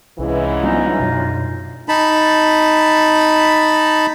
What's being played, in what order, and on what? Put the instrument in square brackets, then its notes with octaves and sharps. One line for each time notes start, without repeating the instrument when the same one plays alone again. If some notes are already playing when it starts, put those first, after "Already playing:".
[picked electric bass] C2 [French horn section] G#2 C#3 E3
[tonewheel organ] F#3 D4 F4 [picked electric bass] G3 B3 [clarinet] D#4
[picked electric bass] F#2 B2
[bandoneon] D#4 A5 B5